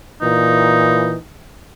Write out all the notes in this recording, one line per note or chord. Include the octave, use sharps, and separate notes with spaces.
A#2 E3 D#4